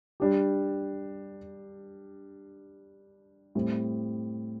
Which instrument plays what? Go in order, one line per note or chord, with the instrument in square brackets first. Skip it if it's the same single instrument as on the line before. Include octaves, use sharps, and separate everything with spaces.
[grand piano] G3 D4 G4
A2 G3 C4